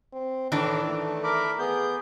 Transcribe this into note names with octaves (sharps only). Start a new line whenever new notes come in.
C4
A2 D#3 E3 D4
A3
A#4 B5 D6
B3 G#4 G6